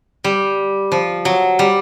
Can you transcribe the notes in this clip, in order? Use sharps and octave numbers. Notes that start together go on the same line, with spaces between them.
G3
F3
F#3
G3